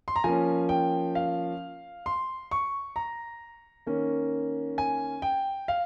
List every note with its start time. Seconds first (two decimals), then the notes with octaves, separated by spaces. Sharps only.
0.08 C6
0.16 A#5
0.24 F3 A#3 C#4 G#5
0.69 G5
1.15 F5
2.06 C6
2.51 C#6
2.96 A#5
3.87 D#3 A#3 C#4
4.78 G#5
5.22 G5
5.68 F5